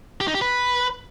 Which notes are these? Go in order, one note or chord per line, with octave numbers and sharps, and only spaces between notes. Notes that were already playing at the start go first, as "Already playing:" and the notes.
G4
D#4
G4
B4